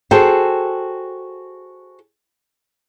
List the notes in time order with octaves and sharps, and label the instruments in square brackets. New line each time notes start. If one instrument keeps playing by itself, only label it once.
[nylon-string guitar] F#4 G#4 A4 C5 G5